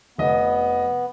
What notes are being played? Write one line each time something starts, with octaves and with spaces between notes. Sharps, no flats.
F1 B3 D#5